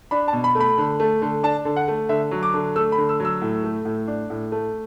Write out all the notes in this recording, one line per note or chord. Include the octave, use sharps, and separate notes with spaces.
D4 B5
A5
B2
B5
A3
B5
D3
A3
D3
D4 A5
D3
F#5
A3
D3 E5
F#3
D6
D3
A3 E6
B5
D3
E6
F#3
E6
A2
A3
A2
D4
A2
A3